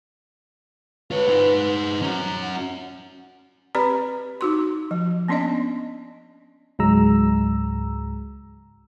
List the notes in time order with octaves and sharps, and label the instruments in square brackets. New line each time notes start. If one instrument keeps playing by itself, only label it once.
[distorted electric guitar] F4 C#5 [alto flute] B4
[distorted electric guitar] D#4 C5
[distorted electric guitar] C#4 F#4 [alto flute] A#5
[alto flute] F#5
[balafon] C4 G4 B4 D5 A#5 B5
D#4 F#4 C6
F3
A#3 B3 C#4 D4 D5 D#5
[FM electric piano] C#2 G#2 F#3 G#3 A#5 E6